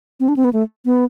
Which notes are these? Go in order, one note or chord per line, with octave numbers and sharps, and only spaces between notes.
C4
D4
C4
B3
A3
B3